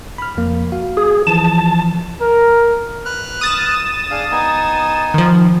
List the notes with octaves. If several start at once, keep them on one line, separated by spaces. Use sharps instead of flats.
B5 F6
F2 F3 A#3
F#4 F5
G#4
E3 F3 A5
A#4
B4 F6 F#6
D#6 A6 E7
D4 G#4 F5
B3 D#4 G#5
D#3 F3